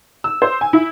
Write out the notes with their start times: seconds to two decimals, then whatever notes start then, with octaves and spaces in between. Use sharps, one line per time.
0.24 E6
0.42 C5
0.61 G#5
0.73 E4